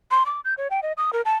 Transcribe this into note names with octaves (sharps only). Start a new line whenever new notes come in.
C6
D6
G6
C#5
G5
D#5
D#6
A#4
A5